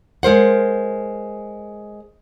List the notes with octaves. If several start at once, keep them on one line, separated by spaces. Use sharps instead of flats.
G#3 A#4 C5 F#5